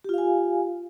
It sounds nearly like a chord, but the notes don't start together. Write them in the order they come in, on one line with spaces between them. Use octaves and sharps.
G4 F4 F5 G#5